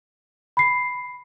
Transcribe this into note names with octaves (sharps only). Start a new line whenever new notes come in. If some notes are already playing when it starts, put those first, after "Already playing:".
B5 C7